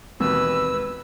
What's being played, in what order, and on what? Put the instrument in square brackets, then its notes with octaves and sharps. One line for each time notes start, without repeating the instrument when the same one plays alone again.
[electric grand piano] D#2 B2 [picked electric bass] E3 G#3 C4 [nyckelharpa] B4 [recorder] E6